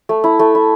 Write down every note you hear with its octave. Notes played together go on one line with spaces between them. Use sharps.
A3
E4
A3
E4